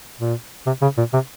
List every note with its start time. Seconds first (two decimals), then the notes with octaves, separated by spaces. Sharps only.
0.20 A#2
0.67 C3
0.82 C#3
0.98 A#2
1.13 C3